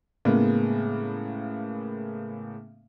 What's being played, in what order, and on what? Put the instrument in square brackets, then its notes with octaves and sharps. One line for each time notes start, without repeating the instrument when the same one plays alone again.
[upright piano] A2 C#3 G#3 A#3 B3